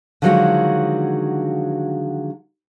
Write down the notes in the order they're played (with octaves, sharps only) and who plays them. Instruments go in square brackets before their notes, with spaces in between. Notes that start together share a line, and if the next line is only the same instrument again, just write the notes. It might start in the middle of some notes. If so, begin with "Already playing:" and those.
[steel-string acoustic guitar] D3 D#3 F3 F#3 G#3 F#4